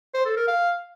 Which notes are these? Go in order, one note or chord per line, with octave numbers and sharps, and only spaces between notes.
C5
A4
A#4
F5